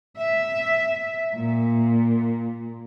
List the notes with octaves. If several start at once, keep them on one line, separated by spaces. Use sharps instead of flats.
E5
A#2